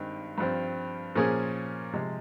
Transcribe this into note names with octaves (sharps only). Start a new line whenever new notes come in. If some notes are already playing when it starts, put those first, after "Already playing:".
Already playing: G2 D#3 G#3 C4
G2 F3 C4
A#2 F3 A#3 C#4 G#4
C3 F3 G#3